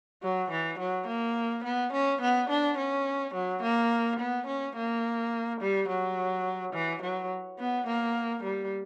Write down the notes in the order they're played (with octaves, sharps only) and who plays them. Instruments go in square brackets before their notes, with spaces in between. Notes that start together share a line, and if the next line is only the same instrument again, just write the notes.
[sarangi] F#3
E3
F#3
A#3
B3
C#4
B3
D4
C#4
F#3
A#3
B3
C#4
A#3
G3
F#3
E3
F#3
B3
A#3
G3